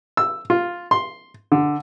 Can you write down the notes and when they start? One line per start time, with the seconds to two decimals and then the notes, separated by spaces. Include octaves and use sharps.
0.17 E6
0.50 F4
0.91 C6
1.52 D3